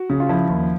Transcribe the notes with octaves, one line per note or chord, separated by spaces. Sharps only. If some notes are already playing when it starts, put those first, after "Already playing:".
Already playing: F#4
C#3
F4
F3 E4
D#2